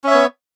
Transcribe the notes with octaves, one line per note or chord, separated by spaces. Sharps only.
B3 C#4 C#5 E5